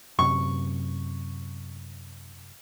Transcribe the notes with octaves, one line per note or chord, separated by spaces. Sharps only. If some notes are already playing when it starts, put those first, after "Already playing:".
F#2 C3 C#6